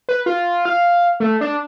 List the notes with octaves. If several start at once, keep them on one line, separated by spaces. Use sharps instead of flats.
B4
F4
F5
A3
D4